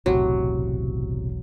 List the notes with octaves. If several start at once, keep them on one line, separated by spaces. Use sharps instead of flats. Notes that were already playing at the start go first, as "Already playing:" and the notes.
E1 B1 E2 A2 C3 F#3